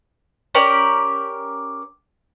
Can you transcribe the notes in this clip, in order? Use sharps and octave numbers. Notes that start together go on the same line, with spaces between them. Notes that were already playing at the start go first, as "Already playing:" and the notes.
C#4 G4 A#4 D5